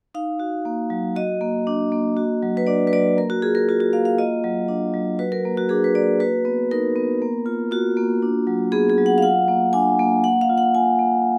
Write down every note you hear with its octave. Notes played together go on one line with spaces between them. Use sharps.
D#4 F5
F#4
A#3
F#3
F#4 D#5
A#3
D4
A#3
F#4
F#3
B4
D4 D5
B4
F#3 D5
A#3 A#4
F#4
F4 G#4
A#4
F4 F#4
F#4
A#3 F5
F5
F4 D#5
F#3
D4
F#3
F#4 B4
A#4
A#3
F#4
D4 G#4
B4
A#3 D5
F#4 B4
B3
D#4 A#4
B3
A#3
F4
F4 F#4
A#3
D4
F#3
B3 G#4
G#4
F#3
F#5
F5
F4 F#5
A#3
D4 G#5
A#3
A#3 F#5
F5
F4
F#5
F4 G#5
A#3